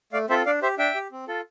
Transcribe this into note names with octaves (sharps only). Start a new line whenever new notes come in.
A3 D5 F5
C4 F4 A4 C5 E5
D4 D5 F5
G4 C5 E5
D4 E5 G5
G4
C4
F4 A4